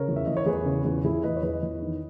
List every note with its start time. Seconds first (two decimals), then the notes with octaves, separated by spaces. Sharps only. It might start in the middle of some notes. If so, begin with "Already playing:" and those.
Already playing: C#3 A#4 C#5
0.08 E2
0.16 E5
0.26 E2 D#5
0.37 C#5
0.46 E2 G#4 B4
0.65 C#3
0.85 E2
1.04 E2 E4 G#4
1.23 E2 B4 D#5
1.36 C#5
1.43 E2 B4 D#5
1.62 E2
1.82 D#3